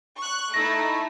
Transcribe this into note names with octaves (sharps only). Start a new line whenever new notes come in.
C#6 F#6
A3 D#4 E4 A#6